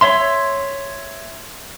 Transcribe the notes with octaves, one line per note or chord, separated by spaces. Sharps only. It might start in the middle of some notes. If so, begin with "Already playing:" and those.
C#5 E5 C6